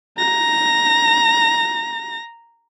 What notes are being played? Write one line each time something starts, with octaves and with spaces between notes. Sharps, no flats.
A#5 A#6